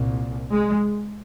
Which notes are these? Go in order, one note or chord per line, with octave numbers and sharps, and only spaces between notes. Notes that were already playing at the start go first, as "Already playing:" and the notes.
Already playing: C2 A#2
G#3